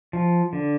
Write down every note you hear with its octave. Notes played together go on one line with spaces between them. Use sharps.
F3
D3